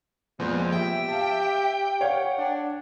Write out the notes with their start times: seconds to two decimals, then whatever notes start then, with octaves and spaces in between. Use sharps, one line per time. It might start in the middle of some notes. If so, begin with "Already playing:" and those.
0.40 F2 A#2 G#3 B3 G6
0.72 G4 E5 G5
1.09 F5 A5
2.01 C#5 F5 F#5
2.38 D4